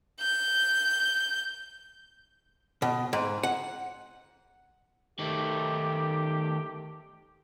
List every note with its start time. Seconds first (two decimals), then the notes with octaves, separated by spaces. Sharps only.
0.21 G6
2.82 B2
3.13 G#2
3.43 F#5
5.19 D#3 A3 G4